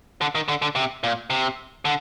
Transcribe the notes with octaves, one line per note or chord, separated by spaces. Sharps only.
D3
D#3
D3
D3
C3
A#2
C3
D3